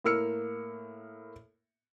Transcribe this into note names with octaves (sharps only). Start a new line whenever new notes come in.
A2 A#3 A#4 E6 F6 C#7